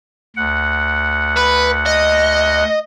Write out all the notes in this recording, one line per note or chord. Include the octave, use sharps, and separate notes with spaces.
D2 F#5
B4
D#5